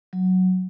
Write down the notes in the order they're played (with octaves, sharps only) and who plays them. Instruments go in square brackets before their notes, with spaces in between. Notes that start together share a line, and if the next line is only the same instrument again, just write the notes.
[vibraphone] F#3